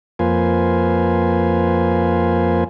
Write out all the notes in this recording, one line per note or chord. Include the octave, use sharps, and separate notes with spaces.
F2 A#3 F4 B4 C5 G#5